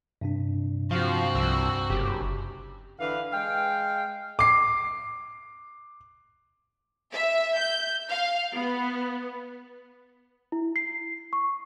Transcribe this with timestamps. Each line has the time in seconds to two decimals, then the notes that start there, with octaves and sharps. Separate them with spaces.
0.21 G2 C3 D4
0.91 F3 C4 F#4 F5
1.35 C2 E6
1.90 F#1 G4
3.00 D3 E3 B4 F5
3.32 G#3 F5 G5
4.39 D6 C7
7.12 E5
7.58 G6
8.09 F5
8.56 B3
10.52 E4
10.76 C7
11.33 C#6